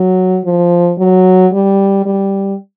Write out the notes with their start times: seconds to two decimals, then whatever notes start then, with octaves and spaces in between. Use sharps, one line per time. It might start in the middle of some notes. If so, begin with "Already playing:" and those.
Already playing: F#3
0.45 F3
0.98 F#3
1.53 G3
2.06 G3